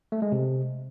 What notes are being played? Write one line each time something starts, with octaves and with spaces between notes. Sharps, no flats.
A3
G#3
C3